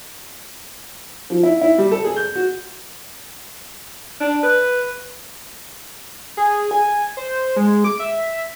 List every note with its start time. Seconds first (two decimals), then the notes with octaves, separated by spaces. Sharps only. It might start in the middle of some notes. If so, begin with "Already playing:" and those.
1.30 F3
1.43 E4
1.61 E4
1.78 G3
1.91 A4
2.04 G#4
2.17 G6
2.35 F#4
4.20 D4
4.43 B4
6.37 G#4
6.71 G#5
7.17 C5
7.56 G#3
7.84 D6
7.99 E5